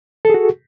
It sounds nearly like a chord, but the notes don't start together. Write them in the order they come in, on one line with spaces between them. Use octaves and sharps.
A4 G#4 F#4